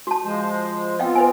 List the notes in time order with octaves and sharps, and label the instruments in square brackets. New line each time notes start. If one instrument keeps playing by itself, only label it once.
[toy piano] F#4 A5
[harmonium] F3 G#3 C5
[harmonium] B3 C4 F4 [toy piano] D#5 F5 G5
[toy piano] B4 C5 G#5